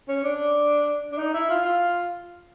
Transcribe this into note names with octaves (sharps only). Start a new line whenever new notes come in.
C#4
D4
D4
D#4
E4
F4
F4